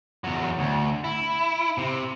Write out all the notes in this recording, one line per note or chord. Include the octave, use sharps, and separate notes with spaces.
E2 F#3
D2
E4
C3